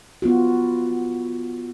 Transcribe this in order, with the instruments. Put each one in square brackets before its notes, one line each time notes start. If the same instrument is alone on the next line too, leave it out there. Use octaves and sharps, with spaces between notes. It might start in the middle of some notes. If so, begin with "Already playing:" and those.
[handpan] B3 F4 F#4